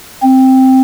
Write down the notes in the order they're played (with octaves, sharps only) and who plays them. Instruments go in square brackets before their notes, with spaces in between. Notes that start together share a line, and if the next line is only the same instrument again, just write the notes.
[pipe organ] C4